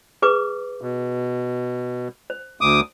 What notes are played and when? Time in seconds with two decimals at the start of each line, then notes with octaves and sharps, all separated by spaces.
0.22 G#4 B4 D6
0.81 B2
2.30 C5
2.61 D2 D6 D#6